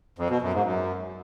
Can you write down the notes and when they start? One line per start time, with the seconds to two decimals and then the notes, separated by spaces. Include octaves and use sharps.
0.19 F2
0.30 B2
0.42 F#2
0.53 G#2
0.65 F#2